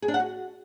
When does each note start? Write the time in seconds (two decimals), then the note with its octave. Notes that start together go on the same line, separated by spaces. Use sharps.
0.02 G#4
0.08 D4
0.14 F#5
0.20 F#4